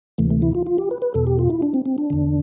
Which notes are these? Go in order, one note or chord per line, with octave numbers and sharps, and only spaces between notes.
D2 C3 E3 A3
A3
E4
F4
F4
G4
B4
B4
E2 B2 A4
G4
F4
E4
D4
C4
C4
D4
E2 D3